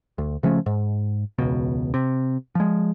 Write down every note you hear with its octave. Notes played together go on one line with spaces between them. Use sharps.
D2
C#3 F3 A3 C#4
G#2
E1 C#2 B2
C3
F3 G#3